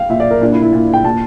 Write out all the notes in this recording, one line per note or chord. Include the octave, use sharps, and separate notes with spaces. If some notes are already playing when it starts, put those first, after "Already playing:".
Already playing: F5 G5
A#2 E5
D5
A#4
A#2 D4
E4
E4
A#2 F4
G5
A#2 A5